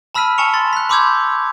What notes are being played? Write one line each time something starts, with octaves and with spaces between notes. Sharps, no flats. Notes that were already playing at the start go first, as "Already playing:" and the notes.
A5 B5 E6 F6 B6 D#7
G#5 A5 C#6 C#7 F7
C6 A6
F#6 B6
B5 C6 D6 E6 G6 G#6